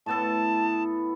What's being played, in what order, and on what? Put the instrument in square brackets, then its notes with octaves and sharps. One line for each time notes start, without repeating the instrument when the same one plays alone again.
[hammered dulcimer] A2 B3 A4 [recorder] A5